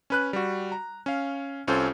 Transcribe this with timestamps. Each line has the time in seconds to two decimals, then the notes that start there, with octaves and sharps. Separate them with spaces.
0.10 C#4 B4 F#6
0.33 G3 F#4
0.72 A#5
1.06 C#4 F5
1.67 C2 C#4 F4 A4 C5